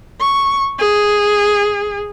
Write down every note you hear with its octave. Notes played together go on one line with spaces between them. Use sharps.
C#6
G#4